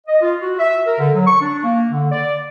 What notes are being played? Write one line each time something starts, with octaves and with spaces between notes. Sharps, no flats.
D#5
F4
F#4
E5
A#4
D3
F#3
C#6
D4
A#3
D3
D5